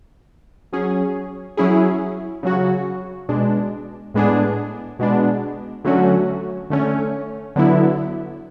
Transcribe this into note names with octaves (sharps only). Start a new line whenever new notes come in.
F#3 C#4 G#4
F#3 C#4 E4 G#4
C#3 F#3 C#4 F#4
B2 G#3 D4
A2 G#3 B3 D4 G#4
B2 G#3 B3 D4
D3 F#3 A3 C#4 F#4
D3 A3 C#4
D3 F#3 B3 E4